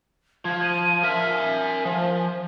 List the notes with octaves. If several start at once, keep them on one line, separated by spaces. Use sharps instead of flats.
F3 G#6
D#7
A#4 E5 F6
G#5
F3